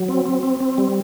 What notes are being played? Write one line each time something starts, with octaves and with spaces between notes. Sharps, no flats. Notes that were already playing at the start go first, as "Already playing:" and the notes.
Already playing: F#3
C4
C4
C4
C4
G3